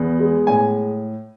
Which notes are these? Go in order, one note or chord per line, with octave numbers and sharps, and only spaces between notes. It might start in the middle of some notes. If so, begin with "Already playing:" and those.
Already playing: E2 B3
G#3
A2 G#5